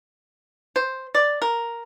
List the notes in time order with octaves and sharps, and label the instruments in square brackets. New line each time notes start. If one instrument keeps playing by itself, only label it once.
[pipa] C5
D5
A#4